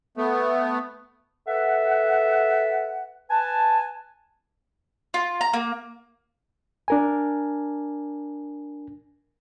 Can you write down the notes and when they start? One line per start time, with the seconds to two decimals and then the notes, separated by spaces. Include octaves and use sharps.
0.17 A3 B3
1.47 A4 B4 E5 F#5
3.30 B4 G#5 A5
5.14 F4
5.41 A#5
5.54 A#3
6.88 D4 A#4 G#5